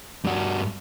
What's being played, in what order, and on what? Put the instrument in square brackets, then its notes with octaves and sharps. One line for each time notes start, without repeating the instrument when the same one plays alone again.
[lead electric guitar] G2 F#4